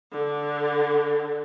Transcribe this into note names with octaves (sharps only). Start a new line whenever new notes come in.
D3